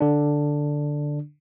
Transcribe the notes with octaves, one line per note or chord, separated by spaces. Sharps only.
D3 D4